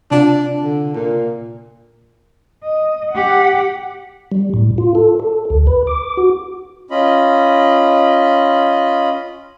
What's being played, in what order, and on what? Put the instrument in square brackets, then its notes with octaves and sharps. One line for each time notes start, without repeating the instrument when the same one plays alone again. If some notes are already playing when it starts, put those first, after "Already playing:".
[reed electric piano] C3 F4 [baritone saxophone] D4
[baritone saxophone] D3
A#2
[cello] D#5
G4 F#5
[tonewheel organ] G3
A2
F4
A4
A4
D2
B4
D6
F#4
[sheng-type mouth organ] C#4 F4 D#5 B5